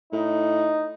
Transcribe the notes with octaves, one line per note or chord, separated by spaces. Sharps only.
A2 D#4